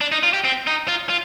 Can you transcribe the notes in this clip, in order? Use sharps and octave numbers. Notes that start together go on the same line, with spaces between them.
D4
D#4
F4
G4
C4
D#4
F4
F4